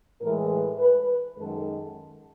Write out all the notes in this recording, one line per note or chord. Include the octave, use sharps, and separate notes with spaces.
A2 E3 G#3 A#4
B4
B4
B4
F#2 D#3 G#3 A4